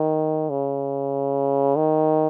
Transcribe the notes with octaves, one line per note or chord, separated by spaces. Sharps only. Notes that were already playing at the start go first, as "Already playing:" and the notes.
Already playing: D#3
C#3
D#3